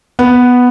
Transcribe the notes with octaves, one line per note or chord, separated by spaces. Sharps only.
B3